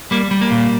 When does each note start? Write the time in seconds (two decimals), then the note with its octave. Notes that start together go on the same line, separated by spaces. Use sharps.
0.11 G3 A#3
0.31 G3
0.41 A#3
0.51 A#2